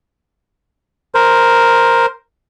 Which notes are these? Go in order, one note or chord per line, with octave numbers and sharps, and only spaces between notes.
A#4 C5